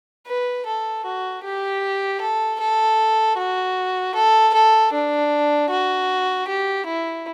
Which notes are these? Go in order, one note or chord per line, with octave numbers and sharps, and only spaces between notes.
B4
A4
F#4
G4
A4
A4
F#4
A4
A4
D4
F#4
G4
E4